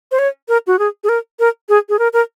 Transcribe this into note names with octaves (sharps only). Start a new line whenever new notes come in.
C5
C#5
A#4
F#4
G#4
G#4
A#4
A#4
G#4
G#4
A#4
A#4